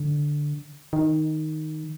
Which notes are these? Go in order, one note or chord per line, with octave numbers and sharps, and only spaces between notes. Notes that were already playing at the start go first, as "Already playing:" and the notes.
Already playing: D3
D#3